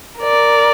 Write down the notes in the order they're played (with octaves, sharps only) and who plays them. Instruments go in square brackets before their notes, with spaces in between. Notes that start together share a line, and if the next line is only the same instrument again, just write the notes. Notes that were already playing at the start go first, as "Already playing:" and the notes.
[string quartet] A#4 D5